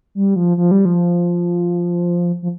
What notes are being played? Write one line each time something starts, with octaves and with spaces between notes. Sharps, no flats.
G3
F3
F3
G3
F3
F3